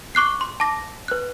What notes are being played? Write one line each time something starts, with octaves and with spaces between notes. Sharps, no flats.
C#6 D6 F#6 C7
C6
A5 D6 A#6
B4 F#6